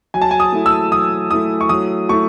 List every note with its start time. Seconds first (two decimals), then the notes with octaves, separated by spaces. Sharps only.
0.14 F#3 G#5
0.22 A5
0.31 G#5
0.40 D#6
0.52 A3 E4
0.66 E6
0.92 F#3 D#6
1.31 A3 E4 D#6
1.61 C#6
1.69 F#3 D#6
2.09 A3 E4 C#6